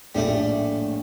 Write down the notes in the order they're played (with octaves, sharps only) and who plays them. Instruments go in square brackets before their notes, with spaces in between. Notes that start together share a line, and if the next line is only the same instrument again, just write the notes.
[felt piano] A#1 A2 [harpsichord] G3 A3 D5